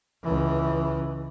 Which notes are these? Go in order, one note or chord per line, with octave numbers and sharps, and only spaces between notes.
C#2 E3